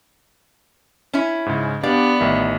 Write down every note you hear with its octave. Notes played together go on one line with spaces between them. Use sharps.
C#4 E4
G#2 C#3
B3 D4 G4 D5 F5
A1 D#3 E5